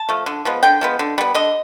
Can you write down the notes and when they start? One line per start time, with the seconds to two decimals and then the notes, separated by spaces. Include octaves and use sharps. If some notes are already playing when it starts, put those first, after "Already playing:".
Already playing: A5
0.09 F3 A3
0.26 D3
0.45 F3 G#3 B3
0.63 D3 G5
0.81 F3 G#3 B3
0.99 D3
1.18 G3 B3
1.34 D3 D#5